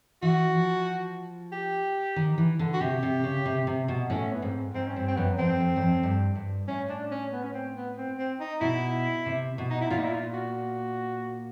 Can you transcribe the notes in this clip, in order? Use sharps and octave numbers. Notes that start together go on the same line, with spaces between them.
E3 F#4
F3
G4
D#3
E3
D3
F#4
C3 G4
C3
C#3
C3
C3
B2
A2 C#4
B3
G#2 C4
G#2 C4
C#4
G2 C4
C4
F#2 B3
F2 C4
F2
F#2
F2
G2
G2
A2 C#4
D4
C#4
B3
C#4
C4
B3
C4
C4
D#4
B2 E4
C3
B2
D#4
E4
A#2 F4
D#4
E4
F4
F#4